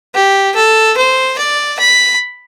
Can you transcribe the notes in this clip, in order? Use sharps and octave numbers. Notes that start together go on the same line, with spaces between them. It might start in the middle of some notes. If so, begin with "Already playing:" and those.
G4
A4
C5
D5
B5